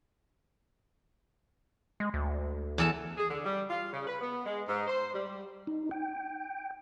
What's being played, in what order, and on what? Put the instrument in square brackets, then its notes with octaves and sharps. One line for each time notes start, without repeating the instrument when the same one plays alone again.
[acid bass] G#3
D2
[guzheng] E2 A4 A5
[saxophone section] G#4
D3
G3
F4
C#3
B4
B3
G#3
G#2
C5
G3
[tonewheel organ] D#4
G5